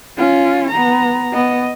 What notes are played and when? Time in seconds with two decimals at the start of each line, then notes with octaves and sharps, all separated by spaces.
0.18 C#4 F4
0.71 B3 A#5
1.33 B3 D#5